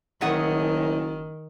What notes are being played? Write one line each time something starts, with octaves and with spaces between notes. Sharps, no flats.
F#1 D#3 A3 G#4 F#5